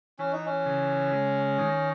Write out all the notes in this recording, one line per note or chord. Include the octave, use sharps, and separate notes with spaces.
E3 C#4
D#4
C#4
C#3
G#3
D#3